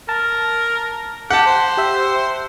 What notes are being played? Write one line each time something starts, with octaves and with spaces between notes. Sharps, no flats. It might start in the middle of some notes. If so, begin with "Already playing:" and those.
A#4 A5
G4 F#5 A5
C5
G4 E5